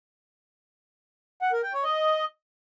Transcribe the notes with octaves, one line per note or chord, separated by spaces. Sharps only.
F#5
A#4
G5
C#5
D#5